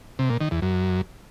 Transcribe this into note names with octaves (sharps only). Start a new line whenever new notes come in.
C3
A#2
D#3
E2
F#2